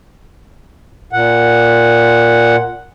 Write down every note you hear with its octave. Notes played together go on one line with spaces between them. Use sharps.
A#2 F#5